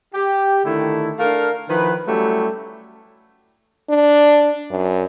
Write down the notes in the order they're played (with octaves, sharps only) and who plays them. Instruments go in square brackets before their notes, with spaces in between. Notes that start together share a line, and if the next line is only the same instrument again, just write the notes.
[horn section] G4
D3 D#3 A3 E4
A3 D4 A#4 F5
D#3 F3 E4 B4
F#3 G3 A3 C#4 E4 G4
[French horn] D4
F#2